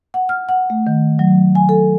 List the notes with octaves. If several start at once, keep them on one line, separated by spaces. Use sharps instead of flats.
F#5
F6
F#5
A3
D#3
F#3
G#5
A4